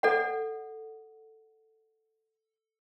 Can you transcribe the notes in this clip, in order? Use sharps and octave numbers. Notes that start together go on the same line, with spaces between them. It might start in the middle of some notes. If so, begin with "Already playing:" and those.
A4 D5 F#5